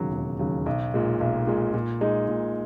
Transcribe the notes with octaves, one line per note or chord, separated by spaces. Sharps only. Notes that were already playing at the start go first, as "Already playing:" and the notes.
Already playing: E1 D#2 C#3 F#3
E1
D#2 C#3 F#3
B1
A#2 G#3
B1
A#2 G#3
A#2
G#3 D#4
A#2